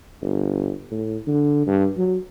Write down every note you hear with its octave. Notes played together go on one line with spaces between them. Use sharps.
G1
A2
D3
G2
F#3